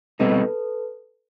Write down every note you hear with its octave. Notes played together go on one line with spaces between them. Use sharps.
B2 G3 C4 D#4 A4 B4